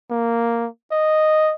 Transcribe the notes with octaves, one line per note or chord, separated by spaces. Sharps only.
A#3
D#5